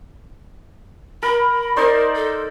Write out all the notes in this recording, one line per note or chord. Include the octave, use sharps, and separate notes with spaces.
A#4 B5
D#4 A#4 C5 D5
A4